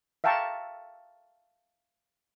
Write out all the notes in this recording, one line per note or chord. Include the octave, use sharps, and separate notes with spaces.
E5 F5 G5 A5 A#5 C#6